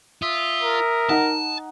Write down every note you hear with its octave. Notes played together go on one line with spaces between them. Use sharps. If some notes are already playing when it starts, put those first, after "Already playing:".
F4 E5 D#6
A#4
D#4 F#5 A5